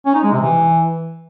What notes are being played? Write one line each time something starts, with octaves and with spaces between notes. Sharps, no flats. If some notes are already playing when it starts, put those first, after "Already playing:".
C#4
D#4
G#3
C3
E3